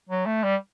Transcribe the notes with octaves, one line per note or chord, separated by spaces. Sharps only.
F#3
A3
G3